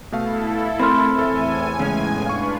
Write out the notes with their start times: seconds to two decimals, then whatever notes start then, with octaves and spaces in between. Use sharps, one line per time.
0.12 B2 A3 E4 A4 F5
0.80 A3 C4 A#4 B5 C6 F6
1.19 E2 A2 A4 E5 G#5
1.80 C#3 G#3 C#4
2.26 D4 F4 B4 F5 C#6